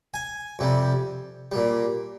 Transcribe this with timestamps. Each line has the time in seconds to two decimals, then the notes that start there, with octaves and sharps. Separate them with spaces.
0.14 G#5
0.59 F2 C3 G3
1.52 A#2 G3